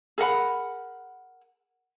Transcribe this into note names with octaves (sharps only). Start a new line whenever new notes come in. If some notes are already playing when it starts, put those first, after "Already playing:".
G#4 A#4 F#5 B5